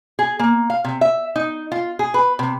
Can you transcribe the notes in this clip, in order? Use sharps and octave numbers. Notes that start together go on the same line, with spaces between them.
G#4
A#3
F5
C3
E5
D#4
F4
G#4
B4
C3